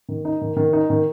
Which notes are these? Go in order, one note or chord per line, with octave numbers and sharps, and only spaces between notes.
D#3
D#4
D#3
D#3
D#4
D#3